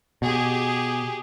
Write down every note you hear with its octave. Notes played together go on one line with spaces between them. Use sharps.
B2 G4 G#4